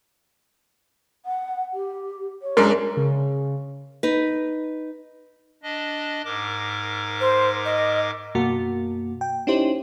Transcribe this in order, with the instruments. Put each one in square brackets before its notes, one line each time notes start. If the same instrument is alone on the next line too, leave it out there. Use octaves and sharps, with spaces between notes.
[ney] F#5
G4
C#5
[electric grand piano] F#2 G#3 D4 [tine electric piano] A#4
[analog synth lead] C#3
[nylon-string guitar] D#4 B4
[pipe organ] D4 D#5
G#2 A#4 D6
[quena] C5
D#5
[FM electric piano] F#2 B2 A#3 F#4
G5
C#4 D#4 E4 G4 C5